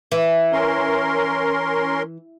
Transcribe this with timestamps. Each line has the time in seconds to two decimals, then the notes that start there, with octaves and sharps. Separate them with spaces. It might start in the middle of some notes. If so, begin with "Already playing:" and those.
0.12 E3
0.52 C#4 A#4 C6